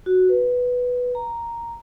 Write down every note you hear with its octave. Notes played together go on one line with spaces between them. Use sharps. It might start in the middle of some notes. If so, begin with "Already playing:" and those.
F#4
B4
A#5